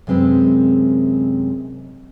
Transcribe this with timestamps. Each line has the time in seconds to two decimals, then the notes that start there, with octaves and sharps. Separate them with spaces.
0.07 F#2 C3 G#3 C4 B4